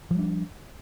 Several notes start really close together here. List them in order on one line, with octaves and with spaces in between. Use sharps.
F3 G3 D4